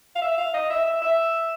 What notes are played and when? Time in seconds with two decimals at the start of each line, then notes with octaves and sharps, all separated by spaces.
0.16 F5
0.22 E5
0.38 F5
0.54 D#5
0.70 E5
0.86 E5
1.02 E5